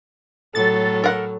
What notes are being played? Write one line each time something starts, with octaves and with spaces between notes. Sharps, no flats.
A2 F#3 A4 A6
A#4 F#5